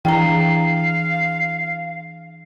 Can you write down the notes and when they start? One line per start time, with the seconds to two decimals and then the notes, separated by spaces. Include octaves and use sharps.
0.05 E3 D4 G#4 F5 G5 A#5